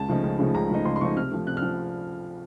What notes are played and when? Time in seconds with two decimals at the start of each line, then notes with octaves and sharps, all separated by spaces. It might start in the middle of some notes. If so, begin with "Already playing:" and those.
Already playing: C#2 A5
0.09 C#3 F3 A3 D#4
0.24 C#2
0.39 C#3 F3 A3 D#4
0.54 C#2 A#5
0.70 C#3 F3 A3 D#4
0.85 C#2 C6
0.96 C6
1.01 C#3 F3 A3 D#4 C#6
1.16 C3 F6
1.32 F3 A3
1.47 C3 F#6
1.57 F6
1.62 F3